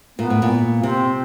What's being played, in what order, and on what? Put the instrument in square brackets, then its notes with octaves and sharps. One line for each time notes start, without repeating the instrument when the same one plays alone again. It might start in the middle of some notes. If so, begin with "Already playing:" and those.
[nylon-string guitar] A#2 [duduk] B3
[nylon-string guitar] A2
A#2
[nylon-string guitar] C3 [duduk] C4